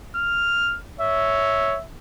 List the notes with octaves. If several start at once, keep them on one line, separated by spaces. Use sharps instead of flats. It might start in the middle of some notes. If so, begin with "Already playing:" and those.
F6
C#5 E5